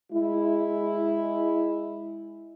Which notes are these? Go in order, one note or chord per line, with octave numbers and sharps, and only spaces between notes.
G#3 E4